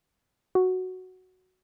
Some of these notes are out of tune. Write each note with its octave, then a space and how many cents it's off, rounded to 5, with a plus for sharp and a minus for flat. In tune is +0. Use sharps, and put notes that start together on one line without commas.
F#4 +0